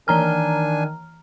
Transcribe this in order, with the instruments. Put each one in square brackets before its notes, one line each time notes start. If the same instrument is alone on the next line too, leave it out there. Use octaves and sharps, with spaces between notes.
[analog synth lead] D#3 [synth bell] E3 A#5 F6 [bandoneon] D4 G#5